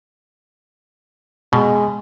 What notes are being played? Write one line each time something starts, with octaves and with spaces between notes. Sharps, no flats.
B2 G#3